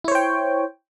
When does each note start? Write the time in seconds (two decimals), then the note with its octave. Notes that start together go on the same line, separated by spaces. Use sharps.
0.04 E4
0.08 C#5
0.12 C5
0.15 G5